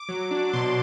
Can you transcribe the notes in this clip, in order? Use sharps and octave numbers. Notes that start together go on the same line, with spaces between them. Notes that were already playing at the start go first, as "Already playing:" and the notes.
Already playing: D6
F#3
D4
B2 C6